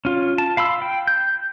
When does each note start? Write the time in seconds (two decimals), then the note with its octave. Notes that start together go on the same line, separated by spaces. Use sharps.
0.05 C#4 F4
0.38 A5
0.57 F5 B5 C6 E6
0.82 G5
1.07 G6